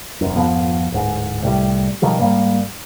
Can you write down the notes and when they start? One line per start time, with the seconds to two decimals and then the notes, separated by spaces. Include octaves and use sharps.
0.21 E1 F#2
0.36 G#1 F2 F3 B3
0.92 D1 G#2
1.42 C2 A2 G3
2.02 B2 D#3 F3 G3
2.19 G#2 G3 A#3